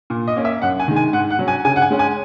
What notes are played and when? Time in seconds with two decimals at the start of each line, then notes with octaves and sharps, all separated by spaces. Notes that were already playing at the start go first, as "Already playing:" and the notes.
0.10 A#2
0.28 D#5
0.36 A#3 C#4
0.45 E5
0.62 F#2 F#5
0.80 G#5
0.88 D#3 G#3
0.96 G#5
1.13 G#2 F#5
1.30 F#5
1.39 F#3 C#4
1.48 G#5
1.65 C#3 G#5
1.76 F#5
1.82 G#5
1.90 G#3 C#4
1.99 G#5